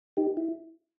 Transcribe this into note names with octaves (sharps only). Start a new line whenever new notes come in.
D#4 G4
E4